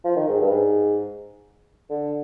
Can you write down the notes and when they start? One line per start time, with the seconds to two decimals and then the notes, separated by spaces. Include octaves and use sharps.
0.04 F3
0.16 D#3
0.28 G#2
0.40 G2
0.50 G#2
1.89 D3